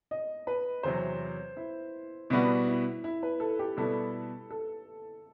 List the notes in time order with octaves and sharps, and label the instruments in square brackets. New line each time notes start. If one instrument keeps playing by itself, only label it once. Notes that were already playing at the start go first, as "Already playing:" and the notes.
[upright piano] D#5
B4
[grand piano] E2 C3 F#3 [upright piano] C5
[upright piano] E4
[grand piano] B2 G3 B3 F#4 [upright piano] E4
[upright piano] E4
E4
B4
A4
G4
[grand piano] B2 G3 B3 E4 [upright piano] A4
[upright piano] A4